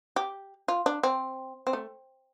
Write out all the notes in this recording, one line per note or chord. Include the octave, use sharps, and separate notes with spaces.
G4
F4
D4
C4
C4
A3